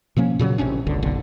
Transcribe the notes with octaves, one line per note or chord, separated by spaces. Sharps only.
B2 F3 A#3 C#4
A#2 C#3 E3 F#3
A1 C3 C#4 D4
G1 C#2 D3
F#1 B1 D3